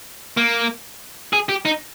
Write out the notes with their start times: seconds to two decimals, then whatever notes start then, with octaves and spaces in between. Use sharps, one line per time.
0.37 A#3
1.33 G#4
1.49 G4
1.65 D#4